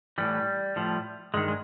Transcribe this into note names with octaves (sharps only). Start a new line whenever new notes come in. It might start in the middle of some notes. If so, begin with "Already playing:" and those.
A2 E3 G3
A2 F3
G2 D#3 G#3
G#3